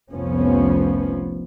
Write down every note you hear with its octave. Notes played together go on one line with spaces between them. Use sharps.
F1 C2 F2 F3 B3 C#4